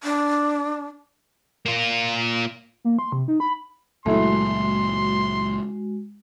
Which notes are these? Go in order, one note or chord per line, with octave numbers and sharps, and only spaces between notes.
D4
A#3 F4
A#3
C6
C3
D#4
B5
C#2 A#2 F#3 G#3 A3 E4 F#4 C6